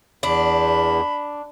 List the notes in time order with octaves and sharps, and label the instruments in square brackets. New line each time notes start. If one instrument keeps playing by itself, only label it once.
[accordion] E2 [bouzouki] D4 [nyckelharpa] B5